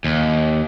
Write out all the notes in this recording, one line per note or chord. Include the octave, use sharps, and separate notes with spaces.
D#2